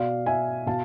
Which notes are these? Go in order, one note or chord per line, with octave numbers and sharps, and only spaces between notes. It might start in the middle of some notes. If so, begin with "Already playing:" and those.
Already playing: B2 D5 F5
E5 G#5
B2 F5 A5